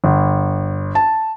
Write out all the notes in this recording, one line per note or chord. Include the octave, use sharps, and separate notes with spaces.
G1
A5